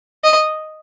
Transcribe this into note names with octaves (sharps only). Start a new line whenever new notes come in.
D#5